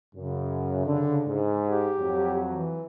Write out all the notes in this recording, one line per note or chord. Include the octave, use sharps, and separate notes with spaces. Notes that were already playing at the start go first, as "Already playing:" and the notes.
F#2 C#3
D3
G#2
G4
F2 F#3
E3